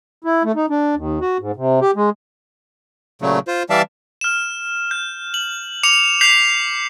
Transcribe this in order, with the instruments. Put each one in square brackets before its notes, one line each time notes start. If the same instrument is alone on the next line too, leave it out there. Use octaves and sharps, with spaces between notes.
[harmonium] E4
A3
D#4
D4
D#2
F#4
G#2
C3
G4
G#3
[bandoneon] A#2 C#3 F#3 A3
F4 C5
E3 G3 D5 E5 F5 A5
[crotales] F6 E7
G6
F#7
D6 C#7 F7
G6 B6 C7 F7 F#7